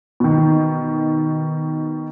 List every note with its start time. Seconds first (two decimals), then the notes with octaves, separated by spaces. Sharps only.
0.20 B2 D#3